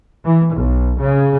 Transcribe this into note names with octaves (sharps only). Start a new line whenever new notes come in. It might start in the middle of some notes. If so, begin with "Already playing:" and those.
E3
B1
C#3